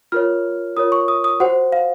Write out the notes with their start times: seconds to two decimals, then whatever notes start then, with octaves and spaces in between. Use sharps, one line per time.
0.12 F4 A#4 C#5 F6
0.77 F4 A#4 C#5 D#6
0.92 C#6
1.08 D#6
1.24 D#6
1.40 F#4 C5 F#5
1.72 F5